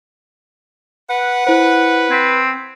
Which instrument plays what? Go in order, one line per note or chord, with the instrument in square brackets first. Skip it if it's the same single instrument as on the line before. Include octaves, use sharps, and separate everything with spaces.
[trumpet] B4 [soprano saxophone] F#5
[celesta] E4 C5 [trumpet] B4
[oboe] C4 [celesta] G#6 B6